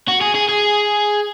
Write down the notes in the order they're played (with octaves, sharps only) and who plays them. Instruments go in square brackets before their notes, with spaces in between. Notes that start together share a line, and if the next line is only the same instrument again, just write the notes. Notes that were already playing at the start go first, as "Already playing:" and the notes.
[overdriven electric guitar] F#4
G#4
G#4
G#4